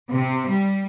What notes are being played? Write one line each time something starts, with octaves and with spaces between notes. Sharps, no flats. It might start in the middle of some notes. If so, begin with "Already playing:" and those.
C3
G3